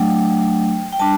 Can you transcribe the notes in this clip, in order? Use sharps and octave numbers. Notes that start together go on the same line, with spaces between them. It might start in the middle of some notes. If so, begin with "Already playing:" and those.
Already playing: F#3 A3 D4 G5
G5
G3 D4 A5